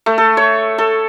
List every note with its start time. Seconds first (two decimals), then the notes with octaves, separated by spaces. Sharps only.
0.06 A3
0.18 A4
0.37 C#5
0.78 A4